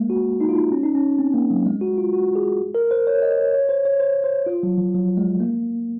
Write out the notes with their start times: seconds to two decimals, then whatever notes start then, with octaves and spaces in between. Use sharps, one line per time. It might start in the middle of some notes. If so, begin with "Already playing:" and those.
Already playing: G#3 A#3
0.10 F#4
0.41 D#4
0.49 F4
0.56 D#4
0.72 C#4
0.83 D#4
0.95 C#4
1.19 C4
1.34 A#3
1.50 F#3
1.66 G#3
1.81 F#4
1.98 F4
2.13 F#4
2.35 G#4
2.75 A#4
2.91 C5
3.07 C#5
3.22 D#5
3.37 C#5
3.54 C#5
3.69 C5
3.85 C#5
4.00 C5
4.24 C5
4.46 F4
4.63 F#3
4.78 F3
4.94 F#3
5.17 G#3
5.40 A#3